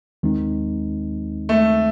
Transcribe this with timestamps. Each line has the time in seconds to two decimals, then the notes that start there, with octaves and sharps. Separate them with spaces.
0.23 D#2 D#3 G#3 C4 D#4
1.49 A3